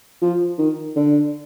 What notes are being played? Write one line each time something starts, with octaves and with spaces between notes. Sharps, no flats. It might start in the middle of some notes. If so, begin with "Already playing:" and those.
F3
D#3
D3